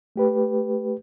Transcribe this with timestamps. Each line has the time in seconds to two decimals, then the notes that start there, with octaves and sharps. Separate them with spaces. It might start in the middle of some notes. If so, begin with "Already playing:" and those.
0.16 A3 G4 B4